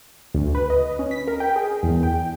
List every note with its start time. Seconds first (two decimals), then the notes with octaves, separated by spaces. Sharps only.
0.35 D2
0.55 B4
0.70 D#5
0.99 C#4
1.11 B6
1.27 A#4
1.40 G5
1.56 G#4
1.83 E2
2.03 G5